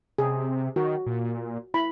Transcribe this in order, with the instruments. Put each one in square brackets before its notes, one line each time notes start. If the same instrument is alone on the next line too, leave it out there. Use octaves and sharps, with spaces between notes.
[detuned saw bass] C3 [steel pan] G#4
[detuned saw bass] D#3 [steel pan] F#4
[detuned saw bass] A#2
[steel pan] E4 B5